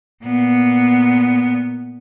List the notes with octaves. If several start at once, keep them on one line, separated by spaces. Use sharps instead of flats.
A#2 B3